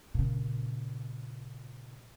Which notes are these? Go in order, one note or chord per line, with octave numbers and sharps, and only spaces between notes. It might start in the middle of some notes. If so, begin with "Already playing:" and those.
A#2 C#3